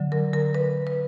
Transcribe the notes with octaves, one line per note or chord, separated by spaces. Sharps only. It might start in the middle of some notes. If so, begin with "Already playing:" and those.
Already playing: D3 F#3
A#4
A#4
B4
B4